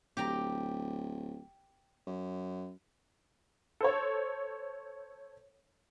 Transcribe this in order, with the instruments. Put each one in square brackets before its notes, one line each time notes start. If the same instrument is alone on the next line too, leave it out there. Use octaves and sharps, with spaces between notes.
[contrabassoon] D1 [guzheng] G4 G5 A#5
[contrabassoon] F#2
[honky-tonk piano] A4 C5 C#5